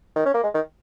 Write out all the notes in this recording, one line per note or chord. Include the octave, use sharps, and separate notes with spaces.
D#3
C#4
A#3
G#3
D#3